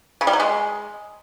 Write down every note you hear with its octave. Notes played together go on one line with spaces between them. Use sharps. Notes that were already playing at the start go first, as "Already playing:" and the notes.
C#3
G3
F#3
G#3